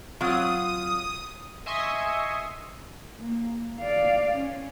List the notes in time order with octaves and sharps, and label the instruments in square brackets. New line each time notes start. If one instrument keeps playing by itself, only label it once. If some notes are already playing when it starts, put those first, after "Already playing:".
[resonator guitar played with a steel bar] F#3 C4 F4 [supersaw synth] D#6
[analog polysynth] D#5 E5 G#5 C6 C#6 D#6
[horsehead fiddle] A#3
D5 F5
C#4